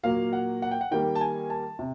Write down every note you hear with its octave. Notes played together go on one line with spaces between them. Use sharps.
A#2 F#3 A#3 F5
F#5
F#5
G5
F#5
D#3 G3 A#3 G5
A5
G#5
A5
C3